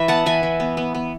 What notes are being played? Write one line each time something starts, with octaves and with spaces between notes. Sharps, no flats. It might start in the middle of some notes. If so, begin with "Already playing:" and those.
Already playing: E3 B4 E5
B3 F#5 A5
E3 E5 G#5
E3
B3
B3
B3